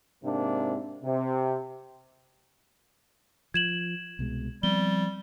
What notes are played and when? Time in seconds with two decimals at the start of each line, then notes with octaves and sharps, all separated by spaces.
0.24 G#2 C3 A#3 D4
1.04 C3
3.54 F3 G#6 E7 F#7
4.19 C2 B2 G#3
4.63 F3 G3 B3 C4 G7